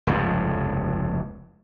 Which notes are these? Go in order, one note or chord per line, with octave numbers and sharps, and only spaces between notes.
F1 C#2 G2 F3